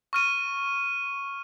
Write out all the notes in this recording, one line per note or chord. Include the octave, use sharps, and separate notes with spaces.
C#6 F6 D#7